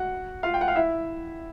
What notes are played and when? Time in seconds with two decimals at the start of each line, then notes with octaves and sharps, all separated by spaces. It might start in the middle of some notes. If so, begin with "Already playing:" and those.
Already playing: F#4 F#5
0.43 F4 F5
0.54 G5
0.61 F#5
0.68 F5
0.75 E4 E5